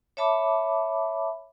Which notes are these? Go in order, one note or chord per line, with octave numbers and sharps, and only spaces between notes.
C#5 E5 A5 B5 D6